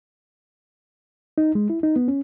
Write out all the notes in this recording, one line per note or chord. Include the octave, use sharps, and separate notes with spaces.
D#4
G#3
E4
D#4
B3
C#4